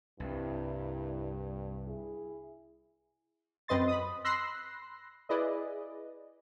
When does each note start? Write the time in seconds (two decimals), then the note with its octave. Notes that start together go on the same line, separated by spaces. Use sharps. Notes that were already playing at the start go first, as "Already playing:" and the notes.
0.20 C2 G2 E4
1.86 E4 G#4
3.68 F#2 C4 B4 D#5 C6 A6
3.88 B5 D#6
4.25 B5 C6 E6 F#6 A#6 C7
5.29 E4 G#4 B4 D5 D#5